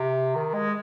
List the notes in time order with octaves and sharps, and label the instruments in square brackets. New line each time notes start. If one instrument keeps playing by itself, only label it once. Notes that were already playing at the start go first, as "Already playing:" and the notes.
Already playing: [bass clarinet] C3
D#3
G#3